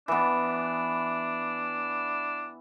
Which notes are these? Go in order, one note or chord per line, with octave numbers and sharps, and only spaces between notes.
E3 B3 D4